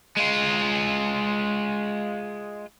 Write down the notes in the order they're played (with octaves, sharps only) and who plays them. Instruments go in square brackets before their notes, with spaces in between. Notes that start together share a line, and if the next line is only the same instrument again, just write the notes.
[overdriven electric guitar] G#3 F4